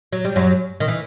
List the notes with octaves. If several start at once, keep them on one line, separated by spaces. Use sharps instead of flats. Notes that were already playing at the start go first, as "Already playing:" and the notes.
F#3
G3
F#2 F#3
D#3
E3